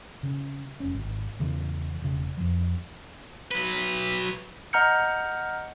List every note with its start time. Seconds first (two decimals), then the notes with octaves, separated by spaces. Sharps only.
0.23 C#3
0.80 F1 C#4
0.94 G#1
1.39 E2 C#3 E3
2.02 E1 C#3
2.37 F2 F3
3.51 F#3 B4
4.73 D#5 F#5 A#5 F6 G6 C#7